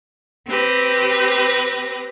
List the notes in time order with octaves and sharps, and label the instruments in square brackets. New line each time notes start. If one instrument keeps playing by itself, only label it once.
[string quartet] C4 G4 B4 A#6